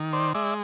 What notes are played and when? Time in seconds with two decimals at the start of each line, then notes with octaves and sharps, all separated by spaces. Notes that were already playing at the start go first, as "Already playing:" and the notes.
Already playing: D#3
0.13 C5 D5
0.35 G#3 D5 E5